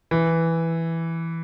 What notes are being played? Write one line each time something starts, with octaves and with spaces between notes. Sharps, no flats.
E3